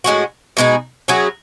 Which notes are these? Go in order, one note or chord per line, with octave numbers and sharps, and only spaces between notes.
A2 G#3 C#4 F#4
B2 G#3 D#4 G#4
F#3 C#4 E4 G#4